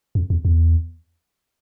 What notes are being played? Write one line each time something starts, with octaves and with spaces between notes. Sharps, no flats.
F2
E2
E2